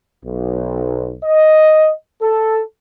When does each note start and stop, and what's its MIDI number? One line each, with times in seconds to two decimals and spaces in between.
0.25 1.15 35
1.24 1.90 75
2.22 2.61 69